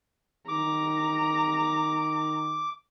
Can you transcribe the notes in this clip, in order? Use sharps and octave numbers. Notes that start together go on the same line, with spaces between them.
D#3 A#5 D6